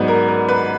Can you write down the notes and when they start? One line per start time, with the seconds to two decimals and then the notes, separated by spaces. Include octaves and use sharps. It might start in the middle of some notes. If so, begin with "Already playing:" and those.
Already playing: G#2 F#3 B3 B4 D5
0.08 A#4
0.28 A#4
0.49 B4